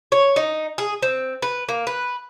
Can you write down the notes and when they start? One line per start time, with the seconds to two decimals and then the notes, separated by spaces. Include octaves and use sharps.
0.12 C#5
0.36 D#4
0.78 G#4
1.02 C4
1.42 B4
1.69 A#3
1.87 B4